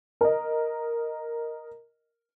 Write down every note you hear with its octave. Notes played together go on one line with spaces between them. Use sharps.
A#4 D#5